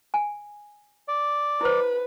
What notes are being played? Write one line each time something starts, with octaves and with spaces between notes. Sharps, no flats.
G#5
D5
E4 B4 C5